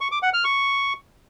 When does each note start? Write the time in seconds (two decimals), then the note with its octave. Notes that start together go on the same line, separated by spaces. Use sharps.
0.01 C#6
0.12 D6
0.23 F#5
0.33 F6
0.44 C#6